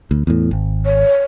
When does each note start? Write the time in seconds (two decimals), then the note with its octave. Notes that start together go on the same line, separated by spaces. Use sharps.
0.11 D2
0.27 E2 A2
0.51 G#1
0.85 C#5